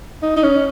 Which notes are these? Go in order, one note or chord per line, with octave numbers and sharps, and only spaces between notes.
D#4
D#4
C#4